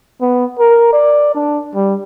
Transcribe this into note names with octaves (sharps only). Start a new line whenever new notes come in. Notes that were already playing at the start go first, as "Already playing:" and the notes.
B3
A#4
D5
D4
G3